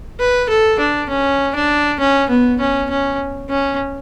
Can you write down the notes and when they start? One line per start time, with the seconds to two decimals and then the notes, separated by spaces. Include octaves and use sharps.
0.20 B4
0.49 A4
0.79 D4
1.10 C#4
1.55 D4
2.00 C#4
2.30 B3
2.60 C#4
2.90 C#4
3.50 C#4